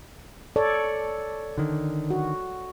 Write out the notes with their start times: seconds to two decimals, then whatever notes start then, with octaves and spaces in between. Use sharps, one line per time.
0.56 A4 C#5 D5
1.57 D3 D#3
2.10 F#4